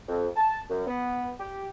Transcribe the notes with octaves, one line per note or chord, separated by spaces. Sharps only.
F2
A5
F#2
B3
G4